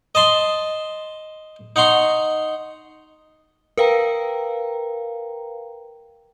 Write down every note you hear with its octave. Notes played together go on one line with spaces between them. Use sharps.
D#5 A5 C6
D#4 F#5 A#5 C6 C#6
A#4 B4 F5 G5 A#5